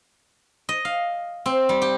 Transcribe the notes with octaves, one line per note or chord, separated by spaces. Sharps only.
D#5
F5
C4
G3
G4